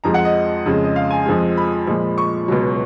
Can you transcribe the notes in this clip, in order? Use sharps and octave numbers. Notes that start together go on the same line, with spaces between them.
F2 F3 G#3 A#5
F#5
D#5
F2 C#3 G#3
D#5
F5
G#5
F2 F3 G#3
B5
A#2 F3 G#3
C#6
C#2 B2 F#3